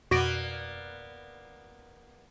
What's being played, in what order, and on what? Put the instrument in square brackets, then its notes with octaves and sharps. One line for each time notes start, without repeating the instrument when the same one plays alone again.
[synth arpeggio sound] F2 B2 [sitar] A#3 B3 D5 [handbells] F#4 A#6 D7